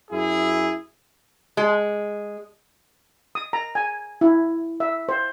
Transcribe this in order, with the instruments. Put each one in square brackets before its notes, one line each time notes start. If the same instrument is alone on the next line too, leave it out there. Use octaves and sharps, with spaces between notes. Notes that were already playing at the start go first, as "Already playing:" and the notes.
[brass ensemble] F#2 E4 G#4
[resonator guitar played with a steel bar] G#3
[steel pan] D#6
A#5
G#5
E4
E5
C5